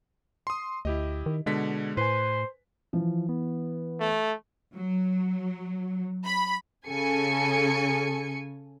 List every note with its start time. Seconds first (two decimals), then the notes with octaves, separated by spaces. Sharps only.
0.47 C6 D#6
0.85 D2 E4 G4 D#5
1.26 D#3
1.46 B2 D3 G#3 B6
1.97 A2 B4 C5 G#5
2.93 E3 F3
3.29 B3
4.00 A3
4.75 F#3
6.25 B5
6.89 C#3 A4 G#5 C#7